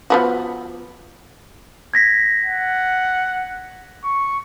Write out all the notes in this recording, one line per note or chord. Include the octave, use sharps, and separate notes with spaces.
F3 B3 F#4
G#6 A#6 B6
F#5
C#6